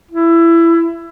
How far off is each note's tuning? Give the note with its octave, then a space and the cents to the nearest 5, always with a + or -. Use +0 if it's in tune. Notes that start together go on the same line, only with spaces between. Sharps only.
E4 +20